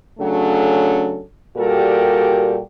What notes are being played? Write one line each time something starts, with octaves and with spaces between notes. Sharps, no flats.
C#3 F#3 A3 C#4 D4 A4
A#2 G3 F#4 G4 A4 A#4